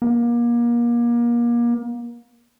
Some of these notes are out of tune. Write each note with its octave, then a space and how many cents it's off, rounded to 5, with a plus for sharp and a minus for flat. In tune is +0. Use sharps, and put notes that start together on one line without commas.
A#3 +30